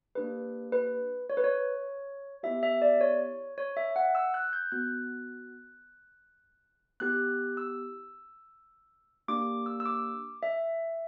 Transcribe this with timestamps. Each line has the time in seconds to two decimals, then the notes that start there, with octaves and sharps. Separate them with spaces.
0.15 A#3 D4 G4 B4
0.72 B4
1.30 C#5
1.37 B4
1.44 C#5
2.43 B3 E4 G4 E5
2.63 E5
2.82 D5
3.01 C#5
3.58 C#5
3.77 E5
3.96 F#5
4.15 E6
4.34 F#6
4.53 G6
4.72 B3 F#4 F#6
7.00 B3 E4 G4 F#6
7.57 E6
9.28 A#3 D4 G4 D6
9.66 E6
9.80 E6
9.86 D6
10.43 E5